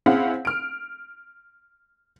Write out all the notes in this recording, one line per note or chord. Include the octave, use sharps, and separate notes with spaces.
C4 C#4 E4 G#4 F5 F#5
F6 D7